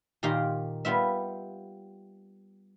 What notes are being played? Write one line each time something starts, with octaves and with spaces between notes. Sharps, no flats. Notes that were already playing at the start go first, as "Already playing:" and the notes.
A#2 D#3 G4 F5 A#5 C6
G3 B3 F4 E5